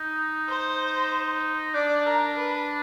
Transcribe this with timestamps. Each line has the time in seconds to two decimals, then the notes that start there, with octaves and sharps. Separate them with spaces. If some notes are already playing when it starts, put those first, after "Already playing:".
Already playing: D#4
0.49 C5
1.74 D4 D5
2.07 A#4
2.37 B4